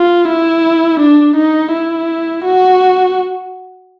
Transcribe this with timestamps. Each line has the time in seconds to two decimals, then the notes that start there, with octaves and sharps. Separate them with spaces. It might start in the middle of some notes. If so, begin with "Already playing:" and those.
Already playing: F4
0.28 E4
1.00 D4
1.36 D#4
1.73 E4
2.44 F#4